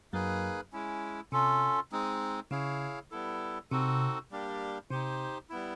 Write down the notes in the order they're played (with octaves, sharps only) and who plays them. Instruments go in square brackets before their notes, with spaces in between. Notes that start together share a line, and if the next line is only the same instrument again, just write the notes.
[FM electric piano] F#2 F#3 [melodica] A#3 D#4 G#4 B4
[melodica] G#3 C#4 E4
[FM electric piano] C3 [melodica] C#4 F4 A4
[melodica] G#3 C4 D#4
[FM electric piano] C#3 [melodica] E4 G#4 C#5 F5
[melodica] G3 B3 E4 A4
[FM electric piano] C3 [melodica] C4 D#4 F#4 A4
[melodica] G3 A#3 D4 G4
[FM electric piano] C3 [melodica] D#4 G4 C5
[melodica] G3 B3 E4